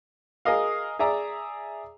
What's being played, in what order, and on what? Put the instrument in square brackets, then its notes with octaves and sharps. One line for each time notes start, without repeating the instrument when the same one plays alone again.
[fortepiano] G#4 A#4 D#5 F5
G#4 D5 E5 A#5